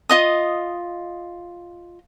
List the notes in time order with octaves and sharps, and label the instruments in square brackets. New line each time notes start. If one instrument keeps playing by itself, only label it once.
[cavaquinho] F4 D#5 D#6